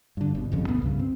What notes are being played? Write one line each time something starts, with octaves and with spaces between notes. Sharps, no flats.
G2 D3
G1 B2
G1 F2 C#3
D2 B2 B3
C2 G2 C#3
C4